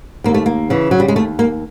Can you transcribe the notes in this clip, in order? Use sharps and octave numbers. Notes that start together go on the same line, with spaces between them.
D#2 A#3
A3
A#3
C#3 E3
F#3
G3
G#3
D#2 A3
A#3